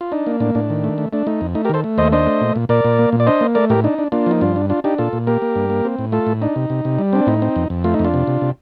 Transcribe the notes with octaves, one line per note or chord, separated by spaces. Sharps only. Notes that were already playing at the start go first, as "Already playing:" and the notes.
F4
D4 D#4
A#3
A2 D4
A2 D4
D#3
A3
A3
A3 D4
A3 D#4
F2
A3 D#4
G4 A#4
D#3 A4 C5
A3
D#2 C5 D#5
D4 C5 D#5
A3
A#2
A#2
A#2 A#4 D5
A#2
A#3
A#2
D5
D4 C5 D#5
A#3
A3 A#4 D5
A2 G4 A#4
D4 D#4
D4
A#3 D4 F4
F3 D#4
G2 D4 F4
D4
D4 F4
D4 D#4 G4
A#2 F4 A4
A#2
A#3 G4 A#4
A#3
G2
A#3
C4
A2
A3 F4 A4
A2
D4 D#4
C3
C3
C3
G3
C4 D4
A2 D#4
C4
F2
F2
A3 F4
D#4
F2
D4 F4
C3
C3
C3